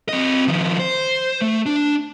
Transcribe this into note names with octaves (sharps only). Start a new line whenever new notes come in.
C4 D#5
D#3 F3
C5
A3
D4